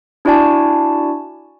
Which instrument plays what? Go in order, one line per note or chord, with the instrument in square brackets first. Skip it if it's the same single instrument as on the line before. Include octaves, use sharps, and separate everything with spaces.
[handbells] D4 E4 F#4 D5 G#5 A5